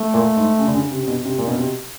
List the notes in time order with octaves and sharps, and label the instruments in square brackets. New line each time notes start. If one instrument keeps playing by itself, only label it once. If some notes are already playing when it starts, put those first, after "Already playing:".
Already playing: [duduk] A3
[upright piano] A#2
G#2
C#3
D3
C#3
C3
C3
B2
C3
A#2
B2
C3